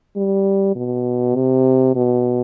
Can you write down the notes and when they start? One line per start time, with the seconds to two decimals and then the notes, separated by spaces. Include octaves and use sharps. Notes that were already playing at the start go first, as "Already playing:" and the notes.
0.16 G3
0.75 B2
1.35 C3
1.95 B2